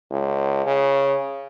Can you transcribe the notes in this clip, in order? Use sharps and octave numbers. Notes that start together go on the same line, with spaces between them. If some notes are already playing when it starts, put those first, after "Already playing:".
C#2
C#3